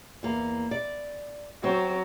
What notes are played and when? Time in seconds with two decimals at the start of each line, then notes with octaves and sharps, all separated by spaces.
0.23 E2 A#3
0.71 D5
1.64 F#3 C4